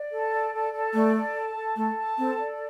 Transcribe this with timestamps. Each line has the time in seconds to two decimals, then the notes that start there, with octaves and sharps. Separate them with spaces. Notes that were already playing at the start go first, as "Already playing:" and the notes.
Already playing: D5
0.11 A4
0.31 D5
0.53 A4
0.72 A4
0.93 A3 D5
1.14 A4
1.35 A5
1.55 A4
1.76 A3 A4
1.97 A5
2.17 C4 A4
2.38 D5